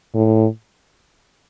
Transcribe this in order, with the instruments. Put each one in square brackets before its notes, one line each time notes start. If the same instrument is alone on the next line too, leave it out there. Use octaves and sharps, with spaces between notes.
[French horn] A2